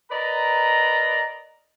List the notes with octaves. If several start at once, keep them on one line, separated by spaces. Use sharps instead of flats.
A#4 B4 D5 D#5 A#5